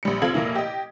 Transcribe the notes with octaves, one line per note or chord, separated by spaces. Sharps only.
A#1 G3 C#7
F1 C4 F4 A4 G#6 F#7
F1 A#2 A#3 E4
G4 D#5